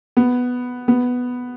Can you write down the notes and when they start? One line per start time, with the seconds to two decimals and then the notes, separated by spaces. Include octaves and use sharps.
0.17 B3
0.88 B3